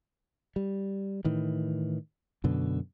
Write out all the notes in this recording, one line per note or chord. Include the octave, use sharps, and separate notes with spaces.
G3
A2 D#3 E3
F#2 B2 D3